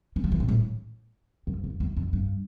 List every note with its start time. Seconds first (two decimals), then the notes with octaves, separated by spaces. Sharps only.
0.16 D3
0.24 F3
0.32 E3
0.40 A#2
0.48 A2
1.47 F2
1.64 F2
1.80 E2
1.97 F2
2.13 G2